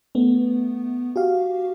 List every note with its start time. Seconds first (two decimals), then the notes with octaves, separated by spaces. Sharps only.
0.15 A3 B3
1.16 F#4 G4 F5